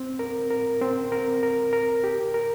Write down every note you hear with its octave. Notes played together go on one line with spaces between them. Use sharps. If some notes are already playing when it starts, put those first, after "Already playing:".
Already playing: C4
A#4
A#4
C4
A#4
A#4
A#4
G4
A#4